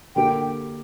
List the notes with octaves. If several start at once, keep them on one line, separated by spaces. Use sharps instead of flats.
D3 A#3 G4 G5